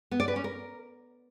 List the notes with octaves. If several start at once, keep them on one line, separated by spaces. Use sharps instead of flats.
B3
D5
B4
C#4
A#4